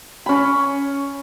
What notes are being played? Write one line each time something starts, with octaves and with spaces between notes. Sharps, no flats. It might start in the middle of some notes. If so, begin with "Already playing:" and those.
C#4 B5